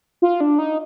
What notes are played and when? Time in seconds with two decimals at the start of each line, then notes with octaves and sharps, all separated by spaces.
0.22 F4
0.40 D4
0.59 D#4